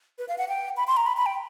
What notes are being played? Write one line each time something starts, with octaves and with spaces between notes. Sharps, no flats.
B4
F5
F#5
G5
B5
C6
A#5
B5
B5
G5